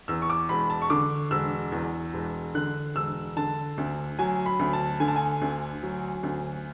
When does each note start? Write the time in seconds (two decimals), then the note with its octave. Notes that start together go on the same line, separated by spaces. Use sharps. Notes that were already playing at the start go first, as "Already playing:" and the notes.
0.08 E2 E6
0.22 C#6
0.30 D6
0.49 E1 B5
0.70 A5
0.82 C#6
0.90 D3 D6
1.31 E1 E6
1.72 E2
2.14 E1
2.55 D3 F#6
2.95 E1 E6
3.36 D3 A5
3.78 D2
4.19 F#3 G#5
4.46 B5
4.59 D2
4.73 A5
5.00 D3 G#5
5.08 A5
5.16 G#5
5.41 D2
5.83 F#3
6.23 D2